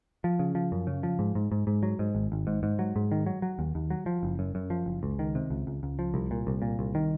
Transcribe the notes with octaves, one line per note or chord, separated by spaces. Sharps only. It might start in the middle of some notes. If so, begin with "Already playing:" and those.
F3
C#3
F3
F#2
C#3
F3
G#2
G#2
G#2
G#2
F#3
G#2
G#1
G#1
G#2
G#2
F#3
G#2
D#3
F#3
F#3
D#2
D#2
F#3
F3
F#1
F#2
F#2
F3
F#1
C#2
D#3
C3
C#2
C#2
C#2
F3
C2
A#2
C2
A#2
C2
D#3